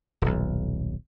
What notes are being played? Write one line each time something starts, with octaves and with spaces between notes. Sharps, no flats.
D#1 B1